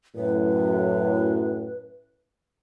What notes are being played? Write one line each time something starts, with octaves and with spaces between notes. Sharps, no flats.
F#2 A2 B4